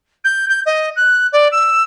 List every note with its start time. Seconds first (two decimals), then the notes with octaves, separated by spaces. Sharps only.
0.24 G6
0.49 G6
0.66 D#5
0.96 F#6
1.32 D5
1.52 E6